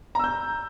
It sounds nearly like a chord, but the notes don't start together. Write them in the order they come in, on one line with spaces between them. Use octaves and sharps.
A#5 E6 G6